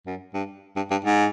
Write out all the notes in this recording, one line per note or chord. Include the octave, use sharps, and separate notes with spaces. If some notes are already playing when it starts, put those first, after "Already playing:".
F#2
G2
G2
G2
G#2